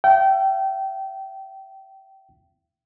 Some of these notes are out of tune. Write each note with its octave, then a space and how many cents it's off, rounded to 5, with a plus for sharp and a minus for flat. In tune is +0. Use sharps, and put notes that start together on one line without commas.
E5 +40 G5 -25